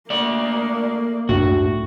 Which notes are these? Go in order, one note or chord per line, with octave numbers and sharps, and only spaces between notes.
A3 A#3 D5
C#2 F#2 A2 D4 F#4